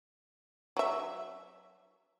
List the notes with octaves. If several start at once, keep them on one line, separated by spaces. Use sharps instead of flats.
F#3 E5